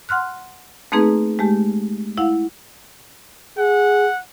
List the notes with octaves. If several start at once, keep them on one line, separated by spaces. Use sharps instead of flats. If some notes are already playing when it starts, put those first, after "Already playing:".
F#5 C6 F6 F#6
A3 A#3 C4 D#4 G#4 B4
G#3 A3 G4
E4 F5 F#5
G#4 F#5